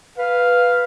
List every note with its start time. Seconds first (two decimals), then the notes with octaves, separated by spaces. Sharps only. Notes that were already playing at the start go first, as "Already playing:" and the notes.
0.18 B4 F5